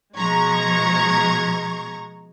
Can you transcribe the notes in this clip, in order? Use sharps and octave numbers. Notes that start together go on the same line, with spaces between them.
B2 F3 G#3 A#5 C#6 G#6